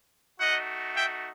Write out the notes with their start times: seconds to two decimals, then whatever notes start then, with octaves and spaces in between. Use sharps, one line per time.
0.40 A3 D#4 F#4 D#5 F#5
0.96 E5 G5